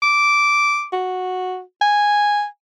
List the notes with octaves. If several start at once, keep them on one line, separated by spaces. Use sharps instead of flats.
D6
F#4
G#5